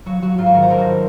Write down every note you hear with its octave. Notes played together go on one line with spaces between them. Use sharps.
F#3 F#4
F#3 F#4
G#2 F4
F#4
D#3 A#4
C5
G#1 A#4
F#4